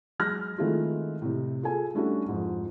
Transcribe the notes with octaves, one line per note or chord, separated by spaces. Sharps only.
F#3 G#3 F6 F#6 A#6
D#3 G#3 A3 C4 E4 F4
A2 C3
F4 G#4 A4 G#5
G3 A3 C#4 D4 E4 F#4
F2 G#2